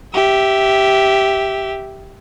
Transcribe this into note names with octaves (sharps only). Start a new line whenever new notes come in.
G4 E5